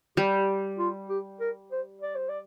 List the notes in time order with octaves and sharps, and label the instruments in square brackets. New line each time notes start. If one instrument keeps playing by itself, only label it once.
[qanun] G3 [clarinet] G4
[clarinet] F4
G4
A#4
C5
D5
C5
D5